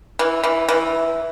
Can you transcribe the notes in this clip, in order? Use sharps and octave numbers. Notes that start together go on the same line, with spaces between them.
E3
E3
E3